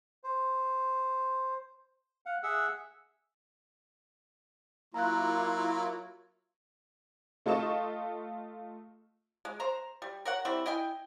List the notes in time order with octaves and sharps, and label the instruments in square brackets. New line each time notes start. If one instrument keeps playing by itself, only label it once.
[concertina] C5
F5 F#5
G#4 E5 F#5 E6
[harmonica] F#3 [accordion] A#3 E4 F4 [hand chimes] A#5 F#6
[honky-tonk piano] A3 F4 A4 D#5 C#6 E7
[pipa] G#3
C5 A#5
G3
A#4 C#5 F#5
E3 G3 C4 E4
E4 D#5 G5 G#5